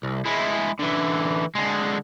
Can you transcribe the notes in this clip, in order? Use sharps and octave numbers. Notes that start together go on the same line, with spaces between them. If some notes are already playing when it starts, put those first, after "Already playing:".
C2
G#3 E4
D3 E3
D3 G#3